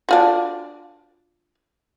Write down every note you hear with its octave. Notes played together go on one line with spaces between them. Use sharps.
D4 F4 F#4